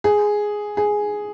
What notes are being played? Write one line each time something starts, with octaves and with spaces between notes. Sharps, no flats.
G#4
G#4